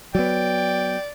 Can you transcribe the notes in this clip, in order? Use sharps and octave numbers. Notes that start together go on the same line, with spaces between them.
F#3 B3 D5 G5